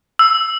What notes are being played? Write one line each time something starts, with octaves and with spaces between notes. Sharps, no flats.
E6